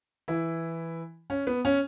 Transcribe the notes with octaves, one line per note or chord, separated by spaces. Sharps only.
E3 E4
C#4
B3
C#4